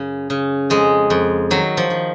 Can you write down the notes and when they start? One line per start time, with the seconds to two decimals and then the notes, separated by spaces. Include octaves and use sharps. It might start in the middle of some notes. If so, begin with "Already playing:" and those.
Already playing: F#2 C#3
0.30 C#3
0.70 F2 G#3
1.10 F2
1.51 D#3 F#3
1.77 F3
1.90 D#3